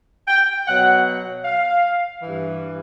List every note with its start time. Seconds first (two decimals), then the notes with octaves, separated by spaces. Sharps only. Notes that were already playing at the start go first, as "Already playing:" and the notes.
0.28 G5
0.67 B2 F#3 F#5
1.45 F5
2.23 G2 E3